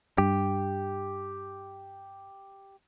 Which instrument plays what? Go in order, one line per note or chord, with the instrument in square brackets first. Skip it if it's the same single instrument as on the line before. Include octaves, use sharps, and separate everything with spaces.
[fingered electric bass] G2 [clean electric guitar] G4